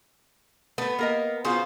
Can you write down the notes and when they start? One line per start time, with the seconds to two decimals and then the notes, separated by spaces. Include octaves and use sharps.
0.78 A3 B3 B4
0.99 A#3 A#4 D#5
1.45 C#3 B3 F4 F#4 G#4 C5